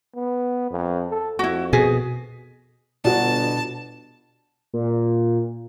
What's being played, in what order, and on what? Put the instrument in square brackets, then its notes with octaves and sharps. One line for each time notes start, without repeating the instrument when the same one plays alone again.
[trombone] B3
F2
A4
[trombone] F2 [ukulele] E4 F#4
[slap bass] B2 [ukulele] G#4
[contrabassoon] G1 [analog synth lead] B2 [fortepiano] D4 F#4 [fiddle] A5
[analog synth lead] A#2